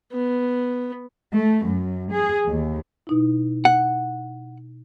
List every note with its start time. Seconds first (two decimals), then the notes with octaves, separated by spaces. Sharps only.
0.13 B3
1.35 A3
1.65 F#2
2.11 G#4
2.45 D#2
3.07 B2 D#4 E4
3.65 F#5